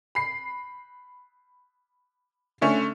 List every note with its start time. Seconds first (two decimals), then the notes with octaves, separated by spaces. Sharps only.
0.15 B5 C7
2.61 D3 A3 C#4